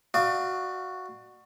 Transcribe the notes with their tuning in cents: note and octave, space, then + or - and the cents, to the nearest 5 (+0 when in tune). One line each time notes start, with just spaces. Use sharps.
F#4 +0 D5 +35 F5 -10